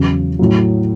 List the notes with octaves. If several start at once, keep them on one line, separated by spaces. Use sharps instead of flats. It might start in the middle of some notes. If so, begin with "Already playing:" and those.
Already playing: E2 C#3 F#3
A2 F#3